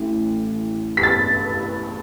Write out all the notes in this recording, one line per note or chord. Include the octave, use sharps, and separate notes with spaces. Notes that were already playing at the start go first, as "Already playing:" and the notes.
Already playing: A1 A2
B6
A6